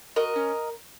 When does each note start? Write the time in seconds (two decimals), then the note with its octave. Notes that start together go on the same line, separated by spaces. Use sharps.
0.16 F#4 A#4 D#5
0.36 C#4